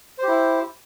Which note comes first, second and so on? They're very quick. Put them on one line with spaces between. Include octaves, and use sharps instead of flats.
C5 G4 E4